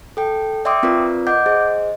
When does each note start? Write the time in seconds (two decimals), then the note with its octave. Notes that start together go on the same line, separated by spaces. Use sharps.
0.17 A4 G5
0.65 D5 E5 G5 C6 D6 D#6
0.83 C4 F4 A#4 B4 D5
1.27 D#5 F#5 D6 G6
1.46 G#4 C5 D#5